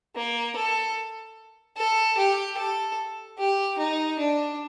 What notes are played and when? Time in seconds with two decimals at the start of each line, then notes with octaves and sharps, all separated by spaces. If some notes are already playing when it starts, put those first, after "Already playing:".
0.16 A#3
0.56 A4
1.77 A4
2.17 G4
2.58 A4
3.38 G4
3.78 D#4
4.19 D4